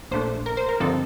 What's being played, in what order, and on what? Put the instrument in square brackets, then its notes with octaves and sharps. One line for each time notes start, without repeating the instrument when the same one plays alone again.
[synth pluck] A#1 A#2 A3 D4 C5
A#4
C5
A#4
G2 D3 F3 C4 D#4 A4